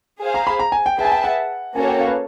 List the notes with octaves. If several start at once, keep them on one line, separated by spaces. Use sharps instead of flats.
G#4 C5 F5
A#5
B5
A#5
G#5
G5
G#4 B4 E5 G5 A5
G#5
G5
F#5
A#3 C#4 F#4 A4 C#5 G#5
G5
F5
B4